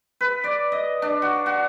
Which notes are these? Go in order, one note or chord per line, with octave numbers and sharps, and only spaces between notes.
B4
D5
D#5
D4
F#4
F#4